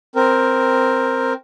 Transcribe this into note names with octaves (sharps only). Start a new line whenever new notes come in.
C4 A#4